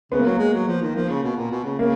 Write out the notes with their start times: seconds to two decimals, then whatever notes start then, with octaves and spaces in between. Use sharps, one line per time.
0.11 C#3 B3
0.19 A#3
0.25 F#3 B3
0.39 G#3
0.54 F#3
0.67 F3
0.82 D#3
0.94 F3 A#3
1.09 C#3
1.23 B2
1.37 A#2
1.51 B2
1.64 C#3
1.79 C#3 A#3